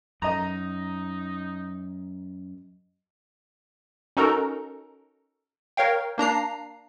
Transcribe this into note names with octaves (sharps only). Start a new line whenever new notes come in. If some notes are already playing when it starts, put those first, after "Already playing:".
F#2 D#4 D#5 A#5
C#4 D#4 F#4 A4 A#4 A#5
A#4 C#5 F5 G5
A#3 D4 A#5 C7